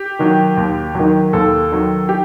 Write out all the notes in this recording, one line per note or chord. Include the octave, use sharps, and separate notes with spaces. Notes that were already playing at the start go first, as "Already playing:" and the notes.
Already playing: G4
D#3 F#3
D#2
D#3 F#3
D#2 A4
D#3 F#3
G4